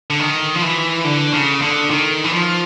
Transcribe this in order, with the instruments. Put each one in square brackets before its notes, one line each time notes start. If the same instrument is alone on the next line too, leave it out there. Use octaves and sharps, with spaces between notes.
[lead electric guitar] D3
D#3
F3
E3
D3
C#3
D3
D#3
E3
F3